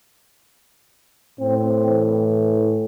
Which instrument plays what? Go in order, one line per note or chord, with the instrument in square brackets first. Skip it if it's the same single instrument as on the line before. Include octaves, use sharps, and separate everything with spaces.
[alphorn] A2 [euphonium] C4
[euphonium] E3